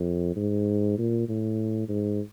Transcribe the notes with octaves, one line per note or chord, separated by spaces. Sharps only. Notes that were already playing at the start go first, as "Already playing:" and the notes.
Already playing: F2
G#2
A#2
A2
G#2